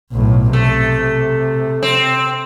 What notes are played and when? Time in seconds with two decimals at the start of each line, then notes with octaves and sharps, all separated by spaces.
0.12 B1 A2
0.53 C3 A3
1.83 C4